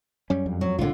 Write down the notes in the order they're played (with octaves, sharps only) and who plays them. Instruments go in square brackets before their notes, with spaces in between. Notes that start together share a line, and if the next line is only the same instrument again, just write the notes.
[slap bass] F#2 G3 [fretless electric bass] C#4
[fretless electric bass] F2
[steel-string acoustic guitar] F#3
[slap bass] C2 A2 [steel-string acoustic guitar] D3 F4